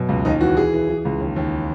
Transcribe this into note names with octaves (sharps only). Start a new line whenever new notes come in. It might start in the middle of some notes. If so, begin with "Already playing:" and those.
Already playing: F#2 B2
C#2
D#2 D#4
E3 F#4
E3 G#4
E3
E3
C#2
D#2
D#2